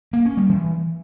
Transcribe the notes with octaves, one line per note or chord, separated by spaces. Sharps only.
A#3
C#4
G3
E3